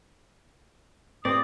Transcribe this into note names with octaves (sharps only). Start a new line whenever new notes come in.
G2 C4 D5 D#6